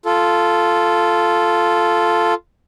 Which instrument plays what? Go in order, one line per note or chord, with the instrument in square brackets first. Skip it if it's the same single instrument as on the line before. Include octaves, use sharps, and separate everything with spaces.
[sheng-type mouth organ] F4 A4